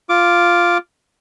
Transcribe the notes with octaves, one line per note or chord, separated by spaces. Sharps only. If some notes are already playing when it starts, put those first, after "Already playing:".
F4 D6